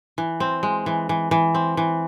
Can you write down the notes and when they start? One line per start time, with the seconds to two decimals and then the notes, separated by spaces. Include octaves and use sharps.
0.18 E3
0.40 C4
0.63 G#3
0.86 E3
1.09 E3
1.31 E3
1.55 C4
1.77 E3